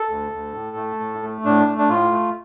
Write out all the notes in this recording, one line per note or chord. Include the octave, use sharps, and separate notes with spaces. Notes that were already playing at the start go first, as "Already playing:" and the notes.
Already playing: A4
D2
D2
A2
A3
A2
A3
A2 D4
A3
D4
A2 F4
A3